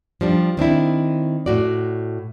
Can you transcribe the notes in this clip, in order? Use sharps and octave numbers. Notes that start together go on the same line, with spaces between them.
F3 G3 D4
D#3 C4 D4 E4
A2 F#4 D5